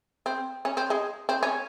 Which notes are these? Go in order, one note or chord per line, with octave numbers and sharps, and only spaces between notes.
C4
C#4
C4
G#3
C4
C#4